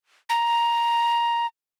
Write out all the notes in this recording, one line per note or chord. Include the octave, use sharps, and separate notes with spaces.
A#5